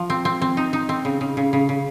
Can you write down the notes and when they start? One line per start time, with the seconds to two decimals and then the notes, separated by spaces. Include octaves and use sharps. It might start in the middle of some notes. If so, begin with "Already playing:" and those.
Already playing: F3
0.10 C4
0.25 C4
0.42 C4
0.57 D#4
0.73 D#4
0.89 C4
1.05 C#3
1.21 C#3
1.37 C#3
1.53 C#3
1.69 C#3